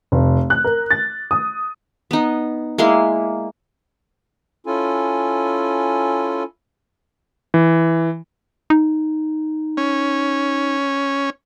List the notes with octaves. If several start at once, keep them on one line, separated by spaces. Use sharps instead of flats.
F1
F#6
A#4
A6
D#6
B3 D#4
G#3 A#3 E4 C6
C#4 E4 F4 A4 G#5
E3
D#4
C#4